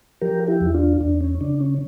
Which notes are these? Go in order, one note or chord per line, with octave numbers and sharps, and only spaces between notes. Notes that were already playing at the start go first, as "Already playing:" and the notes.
F3 G4 A#4
E4 G4
E2
D4 F4
E2 D4
C#4
C#3 D4
C#4